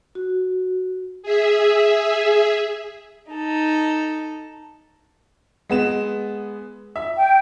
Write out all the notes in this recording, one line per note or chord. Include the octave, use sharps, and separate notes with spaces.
F#4
G#4 E5
D#4 A4
G#3 B3 E7
E5
G5